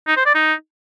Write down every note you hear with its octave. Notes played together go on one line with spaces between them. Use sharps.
D#4
C5
D5
D#4